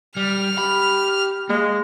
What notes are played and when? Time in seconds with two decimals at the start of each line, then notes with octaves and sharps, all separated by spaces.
0.17 G3 F6
0.58 G4 B5
1.49 G#3 A#3